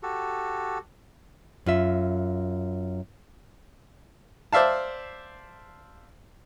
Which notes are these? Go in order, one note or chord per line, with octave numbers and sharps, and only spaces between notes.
F#4 G4 A4
F#2 F4 E5
C5 D5 E5 F5 A5